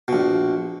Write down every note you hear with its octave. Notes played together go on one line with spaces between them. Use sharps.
A#1 B2